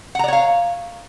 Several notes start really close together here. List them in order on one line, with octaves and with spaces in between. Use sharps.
F#5 A#5 D5 C#5 F5